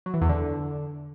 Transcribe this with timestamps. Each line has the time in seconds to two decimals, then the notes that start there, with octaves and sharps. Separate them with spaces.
0.06 F#3
0.14 E3
0.21 E2
0.29 D3